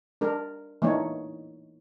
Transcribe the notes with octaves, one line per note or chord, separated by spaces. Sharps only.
D4 A#4
E3 A#3 D4 D#4 C#5